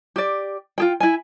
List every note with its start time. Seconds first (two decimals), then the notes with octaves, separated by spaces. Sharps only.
0.16 G4 D5
0.78 F4 G#4 G5
1.00 E4 G#5